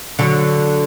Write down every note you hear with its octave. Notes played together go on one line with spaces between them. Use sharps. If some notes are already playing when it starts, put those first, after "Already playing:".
D3 F#3